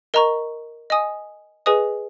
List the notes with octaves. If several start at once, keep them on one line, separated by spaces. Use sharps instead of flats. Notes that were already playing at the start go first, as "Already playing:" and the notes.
A#4 D#5 A#5 C#6
D#5 G#5 D#6
G#4 B4 D#5 G#5 D#6